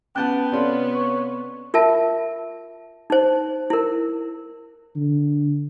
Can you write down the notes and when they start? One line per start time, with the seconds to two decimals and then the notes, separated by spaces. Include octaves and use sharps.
0.16 B3 C#4 F#5 G5 A5 F#6
0.52 C3 C#4 F4 A4 D5
0.94 C#5
1.74 F4 A#4 E5 A5
3.10 D#4 C5
3.70 E4 A#4
4.96 D3